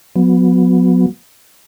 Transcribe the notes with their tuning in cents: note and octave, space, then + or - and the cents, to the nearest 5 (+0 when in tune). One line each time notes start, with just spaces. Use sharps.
F#3 -30 B3 +10